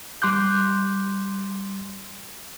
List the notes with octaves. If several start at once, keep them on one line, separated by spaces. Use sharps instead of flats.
G3 C6 D6 F#6 G6